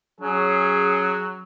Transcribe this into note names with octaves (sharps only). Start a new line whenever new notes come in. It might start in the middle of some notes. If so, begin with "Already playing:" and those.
F#3 C#4 G#4